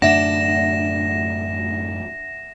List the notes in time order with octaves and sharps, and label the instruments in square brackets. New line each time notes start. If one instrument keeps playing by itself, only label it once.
[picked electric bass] F#2 A2 D3 [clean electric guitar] D4 [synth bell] E5 F#5 [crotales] A#6 E7